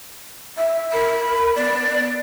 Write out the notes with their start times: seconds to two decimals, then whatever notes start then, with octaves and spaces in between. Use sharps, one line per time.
0.57 E5
0.92 A#4 B5
1.56 B3 D5